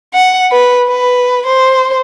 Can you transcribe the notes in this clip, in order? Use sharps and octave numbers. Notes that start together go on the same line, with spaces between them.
F#5
B4
B4
C5